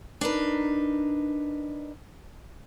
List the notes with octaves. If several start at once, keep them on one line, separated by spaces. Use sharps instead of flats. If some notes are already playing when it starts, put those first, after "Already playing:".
D4 D#4 A#4 B4